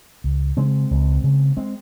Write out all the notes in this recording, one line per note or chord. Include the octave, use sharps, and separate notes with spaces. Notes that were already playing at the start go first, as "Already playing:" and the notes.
C#2
C#3 G#3 C4
C#2
C#3
G#3 C4